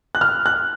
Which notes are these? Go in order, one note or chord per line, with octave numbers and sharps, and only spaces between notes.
F#6
F6
F#6